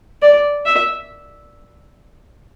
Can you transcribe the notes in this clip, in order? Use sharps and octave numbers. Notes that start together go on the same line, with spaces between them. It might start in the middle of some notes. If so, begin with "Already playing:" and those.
D5
E5